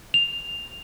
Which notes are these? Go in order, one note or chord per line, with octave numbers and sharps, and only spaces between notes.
F7